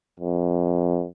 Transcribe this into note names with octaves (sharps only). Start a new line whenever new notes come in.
F2